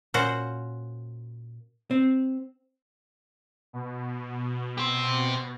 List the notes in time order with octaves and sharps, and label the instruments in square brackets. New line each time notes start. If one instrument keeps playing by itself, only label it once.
[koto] A#2 C#4 F#4 C5 F#5
[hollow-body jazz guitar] C4
[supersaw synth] B2
[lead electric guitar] G4 C5